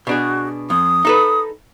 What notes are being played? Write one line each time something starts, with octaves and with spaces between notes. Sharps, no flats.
B2 D4 F#4 G#4
F2 D#6
D#4 A4 B4